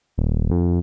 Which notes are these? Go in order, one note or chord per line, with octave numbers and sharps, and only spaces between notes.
D#1
F2